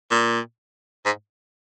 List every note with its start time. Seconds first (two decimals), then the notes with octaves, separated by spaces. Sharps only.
0.11 A#2
1.06 G#2